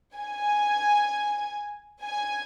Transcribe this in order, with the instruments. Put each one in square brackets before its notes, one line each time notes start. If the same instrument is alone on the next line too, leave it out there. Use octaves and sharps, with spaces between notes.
[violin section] G#5
G#5